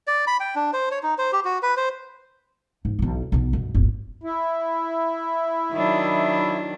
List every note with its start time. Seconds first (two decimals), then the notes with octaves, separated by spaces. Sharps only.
0.07 D5
0.27 B5
0.40 G5
0.56 D4
0.73 C5
0.91 C#5
1.03 D#4
1.18 C5
1.32 G4
1.45 F#4
1.63 B4
1.77 C5
2.85 G#2
2.99 B1 E4
3.32 B1 B2
3.53 G2 B2
3.74 D1 G1
4.23 E4
5.73 D#3 F#3 D4